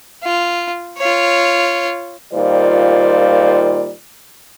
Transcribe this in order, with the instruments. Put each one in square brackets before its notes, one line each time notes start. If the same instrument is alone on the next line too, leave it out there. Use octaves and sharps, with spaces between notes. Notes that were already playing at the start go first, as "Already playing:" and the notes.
[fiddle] F4
F4 C#5
[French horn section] A#2 D#3 G3 F4 C5 D5